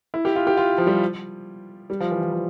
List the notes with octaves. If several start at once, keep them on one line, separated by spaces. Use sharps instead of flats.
E4
G4
F4
G4
F4
F3
G3
G3
F3
E3
E3
F3